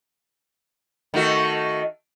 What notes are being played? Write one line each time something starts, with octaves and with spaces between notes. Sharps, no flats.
D#3 A3 F#4